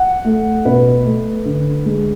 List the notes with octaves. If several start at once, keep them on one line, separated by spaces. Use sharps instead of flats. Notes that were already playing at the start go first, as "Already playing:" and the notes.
Already playing: F#5
A3
B2 B4
A3
D3
G#3